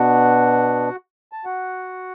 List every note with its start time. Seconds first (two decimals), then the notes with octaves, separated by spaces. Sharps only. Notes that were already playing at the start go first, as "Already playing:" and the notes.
Already playing: B2 B3 D4 F#4 F#5
1.32 A5
1.45 F#4 F#5